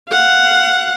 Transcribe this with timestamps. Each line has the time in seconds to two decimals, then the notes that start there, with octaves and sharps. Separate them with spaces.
0.11 F5 F#5